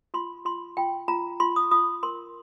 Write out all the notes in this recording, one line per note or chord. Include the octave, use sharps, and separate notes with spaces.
F4 C6
F4 C6
F4 G5
F4 A#5
F4 C6
D#6
F4 D#6
A#4 C6